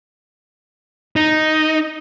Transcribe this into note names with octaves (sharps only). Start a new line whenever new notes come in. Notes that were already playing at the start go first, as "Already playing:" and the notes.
D#4